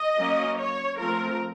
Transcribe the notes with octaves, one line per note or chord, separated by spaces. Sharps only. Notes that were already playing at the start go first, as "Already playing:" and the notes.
Already playing: D#5
F#3 A#3 C#4
C#5
F3 A3 C4 A#4